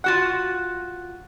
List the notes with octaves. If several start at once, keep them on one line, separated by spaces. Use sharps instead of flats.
F4 F#4 F#5 F#6 A6